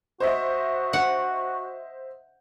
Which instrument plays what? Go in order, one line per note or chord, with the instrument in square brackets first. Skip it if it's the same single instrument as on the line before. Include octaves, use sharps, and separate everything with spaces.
[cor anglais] F#4 [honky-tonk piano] C5 D#5 E5
[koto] F#5